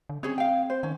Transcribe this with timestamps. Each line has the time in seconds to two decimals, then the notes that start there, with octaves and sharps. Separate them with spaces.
0.09 D3
0.23 C4 C#4 G#4 C#5
0.38 F5 G5
0.70 C5
0.83 D#3 C#4